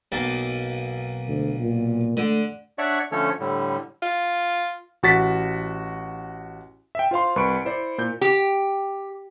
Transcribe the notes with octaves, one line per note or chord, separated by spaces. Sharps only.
B1 A#3 A5
D2
A#2
D3 A3
D4 C#5 D5 E5 F#5 C#6
D3 F3 A3 C#4 A4 C#5
A2 D3 G3
F4
A1 F#4 A6 B6
E5 G5
F4 C5 F5 C6
C2 B4 B5 C#6 C#7 D7
E4 C5 D5
A#2 G6
G4